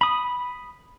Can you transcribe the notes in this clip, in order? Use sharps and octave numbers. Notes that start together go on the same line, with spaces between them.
B5 D#6